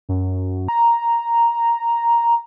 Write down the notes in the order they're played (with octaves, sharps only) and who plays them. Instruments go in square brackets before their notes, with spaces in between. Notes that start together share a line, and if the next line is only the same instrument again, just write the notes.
[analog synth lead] F#2
A#5